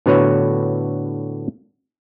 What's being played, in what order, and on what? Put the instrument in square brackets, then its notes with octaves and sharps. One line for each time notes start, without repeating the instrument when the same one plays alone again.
[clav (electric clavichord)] A2 D3 B3 F#4 B4 C#5